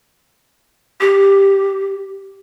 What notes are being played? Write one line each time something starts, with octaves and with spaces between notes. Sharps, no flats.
G4